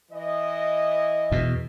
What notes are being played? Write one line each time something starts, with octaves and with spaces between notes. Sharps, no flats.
E3 D#5
E2 B2